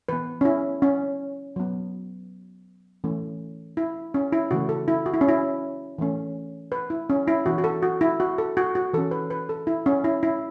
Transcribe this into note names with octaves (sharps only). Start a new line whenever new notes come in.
E3 B3 B4
C#4
E4
C#4
F#3 B3
E3 A3 C#4
E4
C#4
E4
C#3 E3 A3 F#4
A4
E4
F#4
E4
C#4
E4
E3 A3 C#4
B4
E4
C#4
E4
E3 B3 F#4
F#4
A4
F#4
E4
F#4
A4
F#4
F#4
E3 C#4 A4
B4
B4
A4
E4
C#4
E4
E4